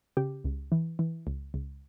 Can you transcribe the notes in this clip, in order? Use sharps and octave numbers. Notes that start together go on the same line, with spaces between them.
C#3 G4
C#2
E3
E3
C#2
C#2